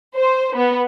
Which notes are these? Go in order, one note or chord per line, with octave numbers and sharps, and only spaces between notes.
C5
B3